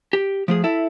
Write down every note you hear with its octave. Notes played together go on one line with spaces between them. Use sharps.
G4
F3 A3 G#4
E4 A4 E5